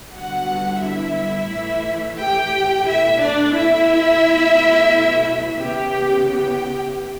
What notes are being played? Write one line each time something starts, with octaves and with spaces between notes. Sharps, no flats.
D3 G3 B3 F#4 F#5
E4 E5
A2 E3 A3
G4 G5
B2 A3 E4 E5
D4 D5
E4 E5
B2 F#3 A3
C#3 E3 B3 G4 G5
G4 G5